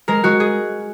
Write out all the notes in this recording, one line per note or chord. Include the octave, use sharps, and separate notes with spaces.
G#3 A#4
G#3 F#4
G#4